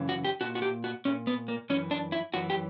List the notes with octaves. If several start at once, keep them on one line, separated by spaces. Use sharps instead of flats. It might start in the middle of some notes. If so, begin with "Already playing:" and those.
Already playing: F#2 C#3 E3
F#4
G4
A#2 F#4
F#4
G4
F#4
A#2 C#4
B3
A#3
F#2 E3 C#4
D4
E4
F#2 E3 F#4
G4